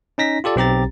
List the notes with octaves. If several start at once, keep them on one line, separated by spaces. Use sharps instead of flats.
C#4 D#4 A#6 B6
F4 G4 A4 D5
B1 C4 G4 A#5 A6